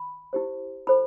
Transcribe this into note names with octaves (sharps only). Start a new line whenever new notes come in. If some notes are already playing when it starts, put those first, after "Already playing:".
Already playing: B5
E4 G4 C5
E4 A4 C5 B5